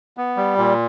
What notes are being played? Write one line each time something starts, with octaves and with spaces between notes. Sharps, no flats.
B3
G3
A#2